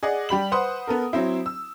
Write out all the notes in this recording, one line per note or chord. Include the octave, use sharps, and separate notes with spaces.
G#4 D5 D#5 F#5
G3 G4 B5 F#7
B4 C5 F#5 C6 D#6
B3 A4 A#4
F#3 C4 E4
E6